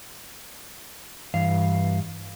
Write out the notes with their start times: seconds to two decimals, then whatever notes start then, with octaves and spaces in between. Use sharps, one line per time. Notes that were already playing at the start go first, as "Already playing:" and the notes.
1.34 G2 E3 F5